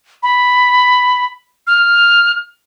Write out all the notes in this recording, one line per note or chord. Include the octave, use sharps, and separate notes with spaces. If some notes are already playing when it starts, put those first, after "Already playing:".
B5
F6